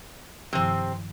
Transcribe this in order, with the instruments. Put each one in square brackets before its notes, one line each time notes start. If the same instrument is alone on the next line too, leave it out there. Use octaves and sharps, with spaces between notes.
[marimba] G2 D#3 F3 [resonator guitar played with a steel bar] C3 C4